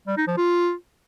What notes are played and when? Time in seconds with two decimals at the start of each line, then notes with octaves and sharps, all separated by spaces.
0.07 G3
0.17 D#4
0.27 F3
0.37 F4